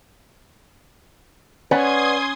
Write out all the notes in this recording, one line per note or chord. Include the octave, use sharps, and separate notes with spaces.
C#4 B4 D5 F#5 C6 D#6 G#6